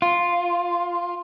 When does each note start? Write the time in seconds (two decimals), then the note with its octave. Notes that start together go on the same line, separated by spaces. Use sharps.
0.02 F4